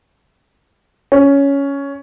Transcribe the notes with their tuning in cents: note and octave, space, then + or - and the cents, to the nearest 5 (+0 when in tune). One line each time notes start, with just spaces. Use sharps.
C#4 +10